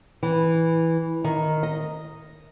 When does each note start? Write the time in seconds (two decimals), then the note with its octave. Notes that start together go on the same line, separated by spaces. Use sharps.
0.23 E3
1.24 D#3
1.63 D#5